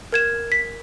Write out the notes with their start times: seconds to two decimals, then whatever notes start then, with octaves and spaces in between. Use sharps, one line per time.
0.12 A#4 G#6 E7
0.52 B6